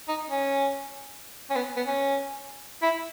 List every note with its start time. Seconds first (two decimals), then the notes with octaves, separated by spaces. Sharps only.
0.08 D#4
0.29 C#4
1.50 C#4
1.56 B3
1.76 B3
1.87 C#4
2.82 E4